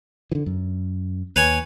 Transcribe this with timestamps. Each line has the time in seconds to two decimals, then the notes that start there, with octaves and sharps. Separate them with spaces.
0.32 D3 E3
0.46 F#2
1.36 D#2 B4 C#5 G#5